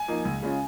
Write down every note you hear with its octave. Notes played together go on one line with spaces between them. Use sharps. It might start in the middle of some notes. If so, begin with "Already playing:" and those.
Already playing: G#5
F3 A#3 D#4
C#2
C#3 G#3 C#4 F4